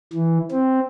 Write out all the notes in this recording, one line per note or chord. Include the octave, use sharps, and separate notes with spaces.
E3
C4